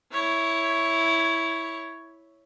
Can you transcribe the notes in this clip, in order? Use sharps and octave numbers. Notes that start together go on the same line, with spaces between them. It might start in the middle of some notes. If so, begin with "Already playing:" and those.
E4 C#5